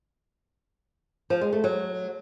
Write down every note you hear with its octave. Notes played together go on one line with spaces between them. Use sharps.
F3
G#3
A3
F#3